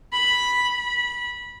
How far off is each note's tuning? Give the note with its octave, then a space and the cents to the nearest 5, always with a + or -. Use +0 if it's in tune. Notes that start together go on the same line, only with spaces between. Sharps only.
B5 -5
B5 -20